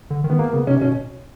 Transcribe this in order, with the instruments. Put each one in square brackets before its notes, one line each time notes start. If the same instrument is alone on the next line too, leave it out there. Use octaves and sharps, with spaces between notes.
[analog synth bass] D3
D#3
[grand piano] B3
A#3
[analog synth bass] C#3 [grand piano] B3
[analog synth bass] C3 [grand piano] C#4
[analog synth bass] B2 [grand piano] C#4